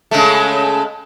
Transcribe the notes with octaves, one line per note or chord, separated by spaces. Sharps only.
C#3 G#3 A3